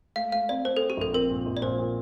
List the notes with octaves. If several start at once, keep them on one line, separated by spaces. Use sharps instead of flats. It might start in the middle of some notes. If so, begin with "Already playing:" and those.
A3 F5
A3 F5
C4 D5
C4 C5
C4 A4
G4
A#1 A4
C4 A#4
A#2
A#1
D5
A#2 C5
A#2